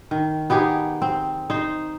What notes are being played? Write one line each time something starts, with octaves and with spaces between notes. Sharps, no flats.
D#3
B3 D#4 G4 G#4
C4
D#4 C5